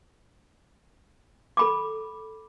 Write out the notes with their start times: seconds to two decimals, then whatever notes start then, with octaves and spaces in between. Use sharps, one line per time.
1.57 A4 B5 D6